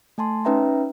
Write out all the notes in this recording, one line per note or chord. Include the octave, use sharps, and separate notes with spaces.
A3 G#5 A5 C6
C#4 D#4 B4 E5 G5 A#5